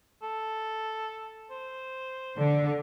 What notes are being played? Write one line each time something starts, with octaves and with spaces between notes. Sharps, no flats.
A4
C5
D3